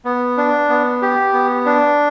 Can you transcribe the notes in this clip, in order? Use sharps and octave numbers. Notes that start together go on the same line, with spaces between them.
B3
D4
B3
G4
B3
D4